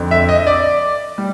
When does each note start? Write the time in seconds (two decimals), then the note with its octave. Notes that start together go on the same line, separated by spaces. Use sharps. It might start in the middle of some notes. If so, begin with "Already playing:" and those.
Already playing: F2 D3
0.11 E5
0.29 D#5
0.47 D5
1.18 G3